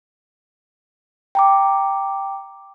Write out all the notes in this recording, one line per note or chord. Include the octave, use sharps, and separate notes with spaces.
G5 A#5 D6